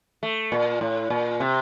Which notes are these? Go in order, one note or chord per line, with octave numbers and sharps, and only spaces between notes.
A3
A#2
A2
A#2
C3